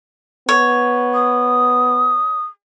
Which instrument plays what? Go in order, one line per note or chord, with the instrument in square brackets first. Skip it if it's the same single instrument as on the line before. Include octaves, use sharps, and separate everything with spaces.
[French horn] B3 [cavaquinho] C#5
[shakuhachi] D#6